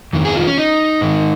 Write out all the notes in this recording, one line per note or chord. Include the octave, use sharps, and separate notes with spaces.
F2 D#3
G#4
F4
C#4
D#4
G#2 D#3